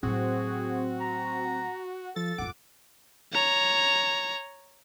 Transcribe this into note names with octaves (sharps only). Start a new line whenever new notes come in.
A2 F#3 C4 F#4 G#4
A#5
F3 A4 A6
D1 F2 F#5 D6
C#5 A#5